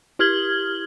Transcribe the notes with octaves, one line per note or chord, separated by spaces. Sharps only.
E4 G4 F6 G#6 F#7 G7